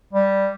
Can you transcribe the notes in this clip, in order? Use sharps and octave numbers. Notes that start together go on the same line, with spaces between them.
G3